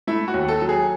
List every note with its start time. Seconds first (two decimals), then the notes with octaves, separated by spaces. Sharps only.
0.07 A3 E4
0.28 F#4
0.34 D#2
0.48 A4
0.62 F#3
0.69 G#4